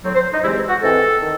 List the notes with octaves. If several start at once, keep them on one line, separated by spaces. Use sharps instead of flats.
A2 F#3 C4 C#5
C5
D#4
E2 C3 E3 G#3 C4 E4
F#4
G#2 E3 C4 A4
D#3